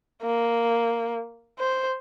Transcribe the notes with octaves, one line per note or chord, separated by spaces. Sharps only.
A#3
C5